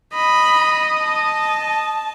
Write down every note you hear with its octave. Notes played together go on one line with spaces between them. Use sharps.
D#5 B5
A5